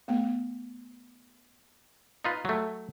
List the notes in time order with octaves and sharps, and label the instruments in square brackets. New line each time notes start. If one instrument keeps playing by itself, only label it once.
[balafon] A3 B3
[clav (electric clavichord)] D#4 F4 B4
F#3 A3